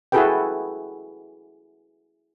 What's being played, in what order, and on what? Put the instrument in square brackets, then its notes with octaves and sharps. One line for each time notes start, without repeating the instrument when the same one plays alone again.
[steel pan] E4 F#4 G#4 A4 B4 G5